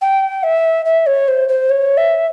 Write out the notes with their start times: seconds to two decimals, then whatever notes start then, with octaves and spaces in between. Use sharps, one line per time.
0.01 G5
0.43 E5
0.85 E5
1.06 C#5
1.28 C5
1.49 C5
1.70 C#5
1.97 E5